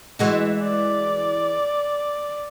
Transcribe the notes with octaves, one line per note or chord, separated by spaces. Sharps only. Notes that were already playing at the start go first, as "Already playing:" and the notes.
E3 G#3 F#4
D5